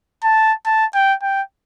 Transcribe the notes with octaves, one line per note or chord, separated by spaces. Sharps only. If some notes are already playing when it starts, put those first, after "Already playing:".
A5
A5
G5
G5